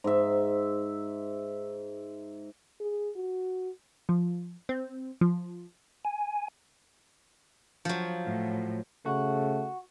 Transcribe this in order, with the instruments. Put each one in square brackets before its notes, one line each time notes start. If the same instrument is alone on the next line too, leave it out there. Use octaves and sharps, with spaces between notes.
[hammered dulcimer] G#2 E5
[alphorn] G#4
F#4
[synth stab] F3
C4
F3
[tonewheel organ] G#5
[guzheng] F3 F#3
[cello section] A2
[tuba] C#3 [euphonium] A3 [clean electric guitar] F#4